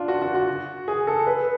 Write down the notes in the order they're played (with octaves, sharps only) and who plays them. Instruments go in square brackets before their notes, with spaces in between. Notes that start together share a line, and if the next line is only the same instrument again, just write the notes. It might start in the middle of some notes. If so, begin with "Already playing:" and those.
Already playing: [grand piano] D4 F4
F#4
F#4
F#4
G#4
A4
B4